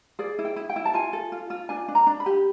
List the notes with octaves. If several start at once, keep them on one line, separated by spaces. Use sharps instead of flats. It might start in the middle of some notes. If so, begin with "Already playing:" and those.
G#4 D5
E4
G5
E4
G5
E4
A5
F4 G#5
A4
F4
F4
D4 G#5
D4
A#5
D4
B5
G4